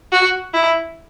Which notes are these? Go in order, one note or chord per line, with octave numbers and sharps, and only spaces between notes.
F#4
E4